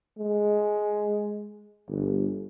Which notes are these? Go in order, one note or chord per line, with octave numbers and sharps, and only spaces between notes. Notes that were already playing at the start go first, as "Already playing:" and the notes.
G#3
G1